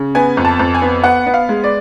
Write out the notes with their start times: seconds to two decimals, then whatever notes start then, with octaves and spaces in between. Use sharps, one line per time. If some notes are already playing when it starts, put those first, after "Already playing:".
Already playing: C#3
0.15 B3 G#5
0.37 F2
0.45 A5
0.59 F2
0.74 G#5
0.82 B3
1.04 B3 F#5
1.26 B3
1.34 F5
1.49 G#3
1.64 D5